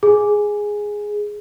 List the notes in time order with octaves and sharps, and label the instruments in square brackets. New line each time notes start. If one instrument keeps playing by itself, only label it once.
[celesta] G#4